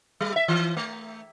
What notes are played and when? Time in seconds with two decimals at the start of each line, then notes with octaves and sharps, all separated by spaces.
0.21 G3
0.36 E5
0.48 E3
0.77 A3